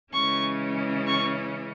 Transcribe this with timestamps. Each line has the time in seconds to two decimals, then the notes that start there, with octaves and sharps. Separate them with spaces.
0.13 C#3 E3 G#3 C#4 C#6
1.07 C#6